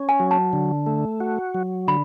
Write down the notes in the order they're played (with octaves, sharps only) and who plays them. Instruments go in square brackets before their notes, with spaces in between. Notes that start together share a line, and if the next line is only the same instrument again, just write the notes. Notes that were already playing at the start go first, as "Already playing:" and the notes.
Already playing: [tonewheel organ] C#4
[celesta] G#5
[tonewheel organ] F#3
[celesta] A5
[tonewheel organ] D3
A3
F#4
F#3
[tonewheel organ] D3 [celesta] B5